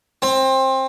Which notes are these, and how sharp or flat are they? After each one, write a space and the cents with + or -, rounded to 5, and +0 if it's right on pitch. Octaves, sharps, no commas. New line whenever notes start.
C4 +20